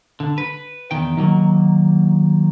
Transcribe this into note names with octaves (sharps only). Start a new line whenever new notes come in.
D3
B4
E2 D#3 G5
D#3 F#3 A#3